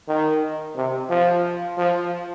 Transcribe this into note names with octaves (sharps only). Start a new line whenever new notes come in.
D#3
C3
F3
F3